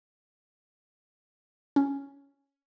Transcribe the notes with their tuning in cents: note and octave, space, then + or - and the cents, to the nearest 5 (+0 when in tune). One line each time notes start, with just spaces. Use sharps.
C#4 +5